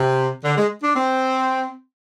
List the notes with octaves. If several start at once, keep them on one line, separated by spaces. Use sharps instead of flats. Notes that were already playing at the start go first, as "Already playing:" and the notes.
Already playing: C3
D3
G#3
D4
C4